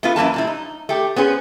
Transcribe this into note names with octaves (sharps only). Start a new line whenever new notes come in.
A3 B3 F4
F#2 E3 A#3 A5
A#2 G3 E4
D#4
A3 G4
B3 C#4 G#4 C5